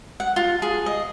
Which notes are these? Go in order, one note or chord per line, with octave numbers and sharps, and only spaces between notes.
F#5
F4
G#4
D#5